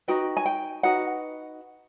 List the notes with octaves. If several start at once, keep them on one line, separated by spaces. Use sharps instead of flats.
D#4 F#4 B4 G5
G#5
G5
D#4 F#4 B4 F#5